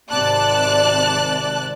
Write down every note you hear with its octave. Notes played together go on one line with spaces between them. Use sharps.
G#1 C3 D5 A5 F#6